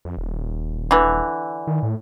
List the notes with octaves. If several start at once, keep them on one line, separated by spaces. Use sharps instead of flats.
F2
D#1
D3 E3
D#3
A2